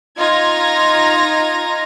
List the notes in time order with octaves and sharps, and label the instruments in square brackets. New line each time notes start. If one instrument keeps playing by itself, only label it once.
[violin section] D#4 F4 A#5 G#6 A#6